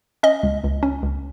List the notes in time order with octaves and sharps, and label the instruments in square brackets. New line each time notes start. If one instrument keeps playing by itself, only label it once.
[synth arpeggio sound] C#4 D#5
C#2
C#2
C#4
C#2